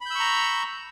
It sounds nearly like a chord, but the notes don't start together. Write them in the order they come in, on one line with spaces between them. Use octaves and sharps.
B5 G6 E6 C#6 A#5